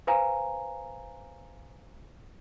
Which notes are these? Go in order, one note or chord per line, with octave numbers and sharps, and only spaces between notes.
B4 C5 F5 G#5 A#5